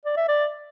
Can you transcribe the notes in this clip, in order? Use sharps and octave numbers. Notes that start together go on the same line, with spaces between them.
D5
E5
D5